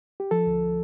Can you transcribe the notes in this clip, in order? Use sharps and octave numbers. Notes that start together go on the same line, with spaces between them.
G4
F3 A4
D2